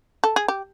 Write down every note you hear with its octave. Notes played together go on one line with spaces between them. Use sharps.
A4
G#4
G4